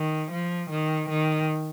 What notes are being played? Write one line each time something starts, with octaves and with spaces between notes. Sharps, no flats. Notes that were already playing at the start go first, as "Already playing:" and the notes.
Already playing: D#3
F3
D#3
D#3